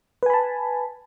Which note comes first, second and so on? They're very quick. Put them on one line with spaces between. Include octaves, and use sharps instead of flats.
B4 G#5 B5 A5